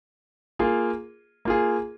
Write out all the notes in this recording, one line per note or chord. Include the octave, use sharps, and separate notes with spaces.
A#3 F4 G#4
A#3 F4 G#4